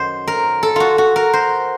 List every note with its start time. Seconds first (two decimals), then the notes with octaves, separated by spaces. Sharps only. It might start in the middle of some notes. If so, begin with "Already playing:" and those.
Already playing: F#2 D#3 F#3 C5
0.27 A#4
0.63 A4
0.76 F4 F#4
0.98 F#4
1.16 A#4
1.33 C5